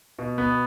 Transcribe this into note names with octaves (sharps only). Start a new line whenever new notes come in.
B2
B3